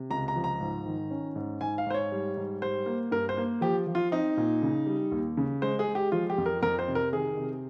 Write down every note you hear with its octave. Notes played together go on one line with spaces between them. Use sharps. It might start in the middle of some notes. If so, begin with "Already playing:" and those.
Already playing: C3
C#2 A#5
A#5
F3
A#5
G#2
D#3
C#4
G#2
G#2 G#5
F5
G#2 C5
C#5
G3
G#2
G3 C5
A#3
G2 A#4
C5
A#3
F3 G4
F3
F4
C4 D#4
A#2
C#3
G3
D#2
C#3
G#3 C5
G#4
G#3
G4
F3 F4
G4
F2
A#4
F2 A#4
C5
C3
A#4
D#3 G#4
C3